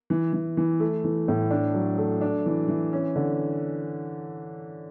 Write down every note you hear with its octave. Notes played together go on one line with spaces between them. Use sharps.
E3
E3
E3
A3
E3
A2
D4
F#3
A3
D4
E3
E3
C#4
D3